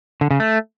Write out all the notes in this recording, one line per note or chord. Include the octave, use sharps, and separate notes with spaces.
D3
C#3
A3